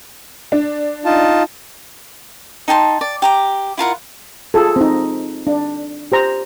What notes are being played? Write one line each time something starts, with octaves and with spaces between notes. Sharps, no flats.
D4
D#4 F4 A5
D#4 G5 A5 C6
D5
G4 A#5 D6
E4 F4 A#4 F#5
F4 G#4 A4
C4 D#4
D4
G4 C5 A#5